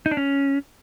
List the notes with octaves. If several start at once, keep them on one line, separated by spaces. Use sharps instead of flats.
D#4
D4
C#4